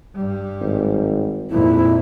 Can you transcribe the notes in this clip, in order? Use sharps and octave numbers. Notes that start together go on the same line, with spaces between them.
G2 G3
G#1
G#1 F2 A#2 E4